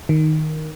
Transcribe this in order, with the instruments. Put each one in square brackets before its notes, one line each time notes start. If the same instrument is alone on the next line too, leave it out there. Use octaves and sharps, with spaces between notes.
[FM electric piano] D#3